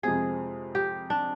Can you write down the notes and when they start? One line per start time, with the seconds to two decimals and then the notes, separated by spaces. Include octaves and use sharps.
0.03 F2 C3 F3 G#3 C4 G#4
0.75 G4
1.10 D4